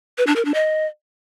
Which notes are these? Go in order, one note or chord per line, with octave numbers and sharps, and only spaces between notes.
B4
D4
A#4
D4
D#5